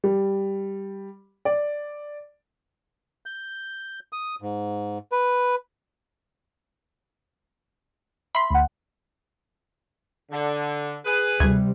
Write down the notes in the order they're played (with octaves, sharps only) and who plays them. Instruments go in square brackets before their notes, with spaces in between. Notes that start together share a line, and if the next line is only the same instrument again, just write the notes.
[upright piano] G3
D5
[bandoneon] G6
D#6
G#2
B4
[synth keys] E5 [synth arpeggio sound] B5 C6
[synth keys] D2 F#5
[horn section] D3
G#4 B4
[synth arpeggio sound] D2 G#6 [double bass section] C3 G3